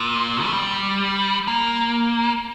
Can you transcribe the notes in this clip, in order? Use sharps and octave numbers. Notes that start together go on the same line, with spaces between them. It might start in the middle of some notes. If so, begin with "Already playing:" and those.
Already playing: A#2
A3
G3
A#3